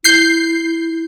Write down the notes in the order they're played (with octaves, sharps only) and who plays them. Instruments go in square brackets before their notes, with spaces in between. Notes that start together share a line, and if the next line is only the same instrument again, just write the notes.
[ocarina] E4 [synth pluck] G6 C7